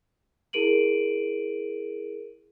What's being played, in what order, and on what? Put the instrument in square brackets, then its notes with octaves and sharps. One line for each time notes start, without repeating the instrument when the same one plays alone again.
[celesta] E4 G#4 A#4 D7 D#7 F#7